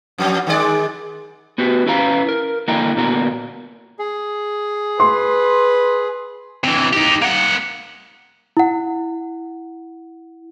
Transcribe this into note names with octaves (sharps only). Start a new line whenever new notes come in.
F2 F#3
D#3 G#3 D5
B3 F#4 G4 B4
C#4 E4 B4 F5 A#5
A#4
D3 A#3 E4 D#5 G5 A#5
A#2 D3 B3 F#4 A#4
G#4
B4 C6
C3 E3
D#4 G4
A#3 F#5
E4 F#5